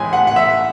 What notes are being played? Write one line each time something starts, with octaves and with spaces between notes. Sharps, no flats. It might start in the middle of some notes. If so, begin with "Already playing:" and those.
Already playing: A2 E3 G#3 G#5
F#5
F#5
E5